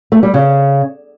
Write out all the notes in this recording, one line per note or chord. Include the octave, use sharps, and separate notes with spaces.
A3
G3
C#3